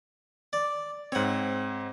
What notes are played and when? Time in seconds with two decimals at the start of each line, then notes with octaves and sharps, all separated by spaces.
0.53 D5
1.12 G#2 C4 C#5 F#5